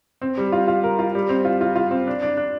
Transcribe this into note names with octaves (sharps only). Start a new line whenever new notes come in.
C4
G3
F4
F4
A#4
F4
G3
C4
F4
F4
F4
C4
D4
D4
D4